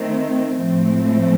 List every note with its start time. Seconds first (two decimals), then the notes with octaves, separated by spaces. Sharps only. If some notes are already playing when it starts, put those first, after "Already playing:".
Already playing: D#3 A3 C4
0.57 A2 F3 A3 C4